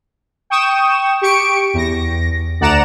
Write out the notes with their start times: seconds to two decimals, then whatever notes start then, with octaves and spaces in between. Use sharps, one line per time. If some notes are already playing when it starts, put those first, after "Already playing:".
0.50 G5 C#6 D#6 E7
1.21 G4 C#6 C#7 D7
1.74 E2 A#6
2.60 D2 D5 F#5 A#5 E7